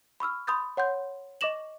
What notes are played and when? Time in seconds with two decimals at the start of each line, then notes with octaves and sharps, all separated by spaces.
0.20 B5 C#6 E6 F6
0.47 B5 C6 D#6 G6 A6
0.77 C#5 F#5 C6 G6
1.41 D#5 C#6 D6 A#6 E7 F#7